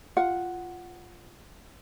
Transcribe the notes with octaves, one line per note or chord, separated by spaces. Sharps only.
F4 F#5